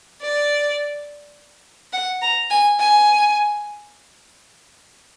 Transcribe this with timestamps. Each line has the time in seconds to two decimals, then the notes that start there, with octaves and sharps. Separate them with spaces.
0.21 D5
1.93 F#5
2.22 A#5
2.51 G#5
2.80 G#5